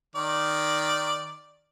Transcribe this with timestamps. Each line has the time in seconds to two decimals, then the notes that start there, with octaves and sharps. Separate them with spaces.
0.15 D#3 D5